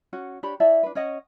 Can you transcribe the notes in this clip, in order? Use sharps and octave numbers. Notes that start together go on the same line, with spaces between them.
C#4 F#4 F#5
D4 G4 C#5 B5
E4 D5 E5 A5
D4 B4
C#4 C#5 D#5 F#5